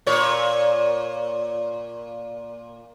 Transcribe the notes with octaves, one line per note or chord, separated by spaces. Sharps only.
A#2 C#5